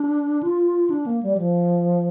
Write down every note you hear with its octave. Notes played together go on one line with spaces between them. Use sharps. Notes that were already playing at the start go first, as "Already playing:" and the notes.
Already playing: D4
F4
D4
A#3
G3
F3